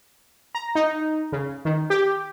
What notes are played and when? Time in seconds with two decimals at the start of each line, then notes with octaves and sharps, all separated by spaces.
0.55 A#5
0.75 D#4
1.32 C#3
1.65 D#3
1.90 G4